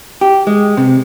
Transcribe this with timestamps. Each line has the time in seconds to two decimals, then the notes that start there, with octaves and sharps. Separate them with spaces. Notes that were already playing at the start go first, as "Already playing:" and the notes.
0.21 G4
0.47 G#3
0.77 C3